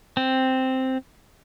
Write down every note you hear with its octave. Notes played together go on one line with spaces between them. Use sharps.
C4